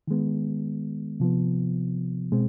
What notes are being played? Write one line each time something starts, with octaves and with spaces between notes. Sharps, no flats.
D#3 G#3 B3
C3 F3 B3
B2 G#3 C4